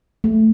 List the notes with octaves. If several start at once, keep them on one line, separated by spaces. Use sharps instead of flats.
A3